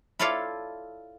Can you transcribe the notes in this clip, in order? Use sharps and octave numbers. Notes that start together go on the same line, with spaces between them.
E4 F4 A4 C#5 D5 F5